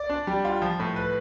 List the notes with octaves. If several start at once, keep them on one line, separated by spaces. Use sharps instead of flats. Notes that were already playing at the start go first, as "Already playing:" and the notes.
Already playing: D5
D4
G3
F4
F3
A2
B4